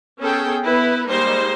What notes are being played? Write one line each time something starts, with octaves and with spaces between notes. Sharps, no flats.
B3 C#4 G#4 A4 G5
B3 E4 B4
G3 G#3 A#3 D#4 C5